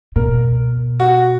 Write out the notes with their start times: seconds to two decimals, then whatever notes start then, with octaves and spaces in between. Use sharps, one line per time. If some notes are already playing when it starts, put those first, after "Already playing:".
0.16 B2 A#4
1.00 F#4